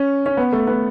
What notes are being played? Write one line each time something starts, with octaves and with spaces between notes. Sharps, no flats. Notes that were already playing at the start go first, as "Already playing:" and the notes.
Already playing: C#4
C#4
B3
A3
B3